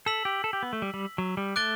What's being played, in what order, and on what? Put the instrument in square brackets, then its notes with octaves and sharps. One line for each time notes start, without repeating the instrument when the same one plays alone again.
[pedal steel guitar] A4 [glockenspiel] E6 B6 F#7
[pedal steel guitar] G4
A4
G4
B3
A3
G3
G3
F#3
G3
[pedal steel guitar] A3 [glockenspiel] D6 F#6 A6 D7 G7